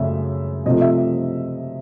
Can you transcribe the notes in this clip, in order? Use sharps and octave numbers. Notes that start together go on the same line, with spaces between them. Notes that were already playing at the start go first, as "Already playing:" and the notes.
Already playing: F#2 C#3 A3 E5
C3 F3 A3 D#5
E5